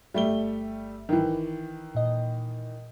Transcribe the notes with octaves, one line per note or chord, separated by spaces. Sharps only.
G1 G3 A3 E5 G7
D#3 E3
A#2 D#5